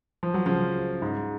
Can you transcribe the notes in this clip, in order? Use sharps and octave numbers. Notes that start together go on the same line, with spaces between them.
F3
F#3
C#3 F3
G#2